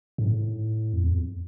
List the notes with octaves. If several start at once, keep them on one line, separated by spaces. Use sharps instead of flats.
G#2
A2
F2
E2
F2